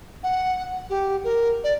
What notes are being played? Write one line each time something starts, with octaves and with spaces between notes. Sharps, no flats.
F#5
G4
A#4
D5